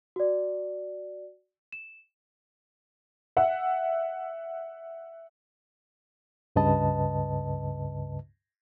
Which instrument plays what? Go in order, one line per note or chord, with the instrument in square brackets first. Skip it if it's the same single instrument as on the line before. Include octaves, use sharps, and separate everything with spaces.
[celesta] F#4 D5
E7
[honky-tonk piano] E5 F#5
[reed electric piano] C#2 G2 C#3 B4 D#5 A5